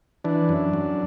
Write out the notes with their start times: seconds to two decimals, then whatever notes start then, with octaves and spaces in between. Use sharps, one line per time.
0.24 E3 D4
0.49 F#2
0.73 F#2